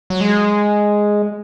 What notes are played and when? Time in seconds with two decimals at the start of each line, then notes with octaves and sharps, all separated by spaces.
0.10 F#3
0.21 G#3